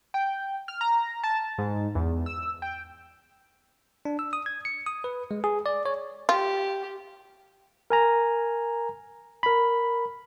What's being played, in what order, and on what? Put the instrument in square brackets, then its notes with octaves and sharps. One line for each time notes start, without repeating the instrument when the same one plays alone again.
[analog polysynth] G5
F6
A#5
A5
G#2
E2
E6
G5
[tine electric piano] D4
E6
D#6
G#6
C#7
D#6
B4
G#3
G#4
D5
C#5
[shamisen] F4 [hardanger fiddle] G4
[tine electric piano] A#4 G#5 A#5
A#4 B5